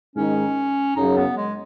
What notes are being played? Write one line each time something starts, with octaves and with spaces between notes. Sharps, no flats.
G#2 D#3 G#3 C#4 D#4
F#2 C#3 F#3 D#4
B3
G#3